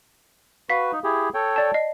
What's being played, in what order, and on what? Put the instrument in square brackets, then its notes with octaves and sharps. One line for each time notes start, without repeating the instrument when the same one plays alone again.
[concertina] F#4 B4 [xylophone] F5 B6
[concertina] D#4
E4 G4 G#4
A4 C#5 G5
[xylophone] D5 A5
D#5 C7